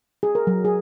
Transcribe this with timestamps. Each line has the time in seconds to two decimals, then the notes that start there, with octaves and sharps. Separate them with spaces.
0.23 G#4
0.35 A#4
0.47 F#3
0.65 G#4